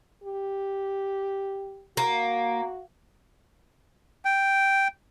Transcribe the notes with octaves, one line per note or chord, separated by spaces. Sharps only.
G4
A#3 F#4
G5